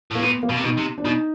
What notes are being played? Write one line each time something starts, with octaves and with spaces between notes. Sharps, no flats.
A2 A#3
A#2 B3
A#3
B2
C3
B2 D#4
C3
D4
B2 D#4